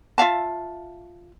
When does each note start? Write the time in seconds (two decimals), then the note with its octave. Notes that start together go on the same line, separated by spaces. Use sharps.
0.18 F4 E5 F5 A5